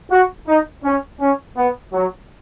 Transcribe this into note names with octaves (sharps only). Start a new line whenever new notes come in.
F#4
D#4
C#4
C#4
B3
F#3